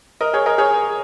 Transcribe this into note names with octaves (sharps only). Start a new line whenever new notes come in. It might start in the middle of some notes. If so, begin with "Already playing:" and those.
A#4 D#5
G#4 C#5
A#4 D#5
G#4 C#5